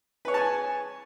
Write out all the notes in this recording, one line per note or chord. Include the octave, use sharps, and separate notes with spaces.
G#4 B4 C#5 G#5 A5